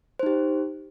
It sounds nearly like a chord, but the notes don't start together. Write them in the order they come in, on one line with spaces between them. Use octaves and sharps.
C5 D#4 G4